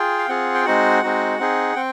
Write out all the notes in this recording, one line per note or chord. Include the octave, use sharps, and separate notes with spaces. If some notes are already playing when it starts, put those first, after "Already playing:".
Already playing: F4 G#4 G5
F5
C4 F4 G#4 F#5
G5
G#3 C4 D#4 F#4 F#5
G#3 C4 D#4 F#4
C4 D#4 G#4
C4 G5